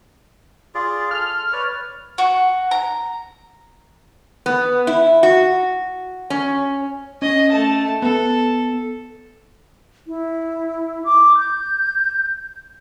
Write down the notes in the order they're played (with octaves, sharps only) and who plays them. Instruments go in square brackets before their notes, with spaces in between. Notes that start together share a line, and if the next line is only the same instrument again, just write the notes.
[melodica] F4 G#4 D5
[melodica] A4 [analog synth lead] F6
[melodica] B4 C#5 D5
[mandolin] F#4
A#5
[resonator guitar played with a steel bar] B3
E4
F#4
C#4
[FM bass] C#4 [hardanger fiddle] D#5
[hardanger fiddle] A3 A5
[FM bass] B3 [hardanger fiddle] A4
[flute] E4
D6
G6